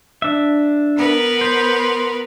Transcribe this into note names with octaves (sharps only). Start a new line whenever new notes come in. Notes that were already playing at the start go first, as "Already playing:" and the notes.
D4 E5
B3 A#4 B4
C5